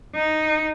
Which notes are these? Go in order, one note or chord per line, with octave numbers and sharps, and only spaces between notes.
D#4